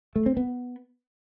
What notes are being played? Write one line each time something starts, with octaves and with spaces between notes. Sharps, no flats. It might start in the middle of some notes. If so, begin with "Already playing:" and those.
A3
C4
B3